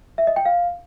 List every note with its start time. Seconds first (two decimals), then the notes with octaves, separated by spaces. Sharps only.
0.18 E5
0.27 D#5
0.36 G5
0.45 F5